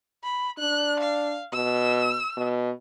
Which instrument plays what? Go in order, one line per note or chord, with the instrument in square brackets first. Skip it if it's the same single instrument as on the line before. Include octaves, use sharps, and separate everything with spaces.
[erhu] B5
[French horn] D4 [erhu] F#6
[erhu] F5
[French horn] B2 [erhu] E6
[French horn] B2